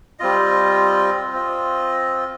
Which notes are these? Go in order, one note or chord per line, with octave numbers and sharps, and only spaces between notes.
G3 C4 F4 D#5
C4 F4 D#5